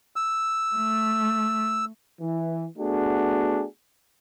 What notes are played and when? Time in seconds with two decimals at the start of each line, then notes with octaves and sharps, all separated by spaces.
0.16 E6
0.75 A3
2.20 E3
2.78 A3 B3 D4 F#4 G#4